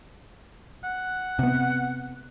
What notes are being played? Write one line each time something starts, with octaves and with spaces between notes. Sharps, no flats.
F#5
C3 B3